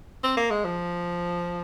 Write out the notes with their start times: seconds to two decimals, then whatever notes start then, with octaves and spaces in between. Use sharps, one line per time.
0.24 C4
0.37 A#3
0.51 G#3
0.65 F3